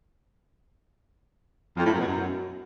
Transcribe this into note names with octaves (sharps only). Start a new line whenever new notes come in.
F2
A2
F#2
B2
F#2